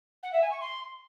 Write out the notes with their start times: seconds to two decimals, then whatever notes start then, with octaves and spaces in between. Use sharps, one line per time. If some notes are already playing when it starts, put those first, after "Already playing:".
0.23 F#5
0.32 E5
0.41 G#5
0.51 C#6
0.60 C6